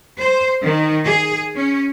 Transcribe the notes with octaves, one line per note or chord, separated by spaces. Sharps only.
C5
D#3
G#4
C#4